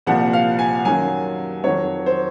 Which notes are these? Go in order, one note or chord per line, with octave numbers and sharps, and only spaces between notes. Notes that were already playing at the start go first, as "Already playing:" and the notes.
C2 A#2 F3 F#5
F5
G#5
F#2 D#3 F#3 G#5
F2 D#3 F#3 C#5
C5